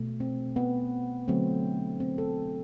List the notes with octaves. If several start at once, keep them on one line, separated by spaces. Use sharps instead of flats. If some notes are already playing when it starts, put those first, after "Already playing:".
Already playing: B2 A3
C4
B3
D3 F#3 A3 C4
C4
A4